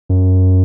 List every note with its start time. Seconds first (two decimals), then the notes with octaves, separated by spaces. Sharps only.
0.09 F#2